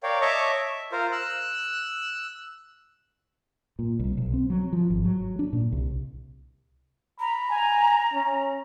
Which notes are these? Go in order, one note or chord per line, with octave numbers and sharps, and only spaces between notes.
A#4 C#5 D5 F5 G5
C#5 D#5 E5 A5 C#6 D6
E5
F4 A#4 C5
E6 F#6
A#2
C2
B1
C4
F#3
F3
G#1
F#3
D4
A#2
C2
A#5 B5
G#5
C#4